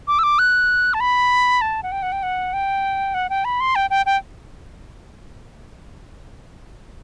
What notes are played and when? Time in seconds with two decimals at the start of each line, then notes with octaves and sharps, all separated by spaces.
0.08 D6
0.19 E6
0.23 D6
0.39 F#6
0.94 A5
1.00 B5
1.61 A5
1.83 F#5
1.92 G5
2.02 F#5
2.12 G5
2.23 F#5
2.53 G5
3.14 F#5
3.30 G5
3.45 B5
3.60 C6
3.76 G5
3.90 G5
4.06 G5